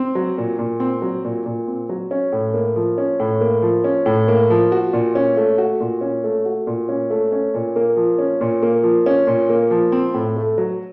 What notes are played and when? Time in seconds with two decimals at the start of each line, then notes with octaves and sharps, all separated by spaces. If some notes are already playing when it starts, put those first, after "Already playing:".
Already playing: C4
0.15 F#3
0.38 A#2
0.59 A#2
0.80 C4
1.02 F#3
1.25 A#2
1.46 A#2
1.68 C4
1.89 F#3
2.11 C#4
2.32 A2
2.54 A#3
2.76 F3
2.98 C#4
3.20 A2
3.41 A#3
3.62 F3
3.84 C#4
4.06 A2
4.28 A#3
4.50 F3
4.72 F#4
4.93 A#2
5.15 C#4
5.37 A3
5.58 F#4
5.80 A#2
6.01 C#4
6.24 A3
6.45 F#4
6.67 A#2
6.89 C#4
7.10 A3
7.32 C#4
7.54 A#2
7.76 A#3
7.97 F3
8.19 C#4
8.41 A#2
8.63 A#3
8.83 F3
9.06 C#4
9.27 A#2
9.49 A#3
9.71 F3
9.92 C4
10.14 A2
10.37 A3
10.58 F#3